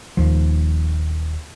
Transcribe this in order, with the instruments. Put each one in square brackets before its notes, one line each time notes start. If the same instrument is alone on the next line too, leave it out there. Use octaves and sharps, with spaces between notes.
[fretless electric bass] D#1 D#2 F3